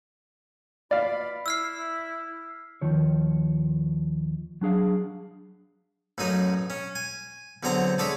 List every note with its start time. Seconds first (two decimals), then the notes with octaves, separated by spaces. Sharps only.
0.91 B2 F4 D5 F5 B5
1.46 E4 E6 F6 C7
2.82 D#2 D#3 F3 C#5
4.61 F#3 D4 G#4 F5
6.18 A1 F#2 F#3 D#4 D#5
6.70 C#4
6.95 G#5
7.63 E2 D3 F#3 C4 C5 A#5
7.98 G#3 D4 A4 C#5 E5